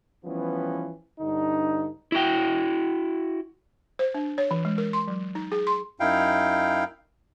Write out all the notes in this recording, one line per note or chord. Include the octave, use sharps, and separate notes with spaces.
E3 F3 G3 B3 C#4
G2 D3 D#4
E4 F#4 G5
C5
D4
C#5
E3
G#3
A#4
C6
F#3
D#4
G#4
C6
F#2 D#4 E4 F5 G5